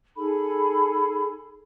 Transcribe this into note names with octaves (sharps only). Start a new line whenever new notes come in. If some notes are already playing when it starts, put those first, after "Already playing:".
D#4 G#4 A4 B5